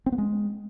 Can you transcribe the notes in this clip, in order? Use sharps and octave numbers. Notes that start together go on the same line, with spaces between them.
C4
B3
G#3